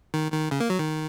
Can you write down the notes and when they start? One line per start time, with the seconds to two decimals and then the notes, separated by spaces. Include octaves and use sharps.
0.14 D#3
0.32 D#3
0.51 C#3
0.60 A#3
0.70 F#3
0.79 D#3